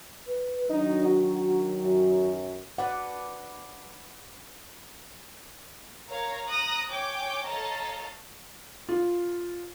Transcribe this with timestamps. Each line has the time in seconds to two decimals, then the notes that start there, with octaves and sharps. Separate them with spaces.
0.27 B4
0.70 D#3 F#3 D4 D#4
1.05 F#4
1.83 F#2 F#4
2.78 D4 B4 D5 F#5
6.08 A#4 C#5 F5 A#5
6.49 A#5 D#6 F#6 A#6
6.90 C#5 G5 G#5 D6 G6
7.46 A4 C#5 D#5 F5 A5 A#5
8.89 F4